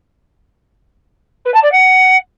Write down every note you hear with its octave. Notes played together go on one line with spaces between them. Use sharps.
B4
A5
D5
F#5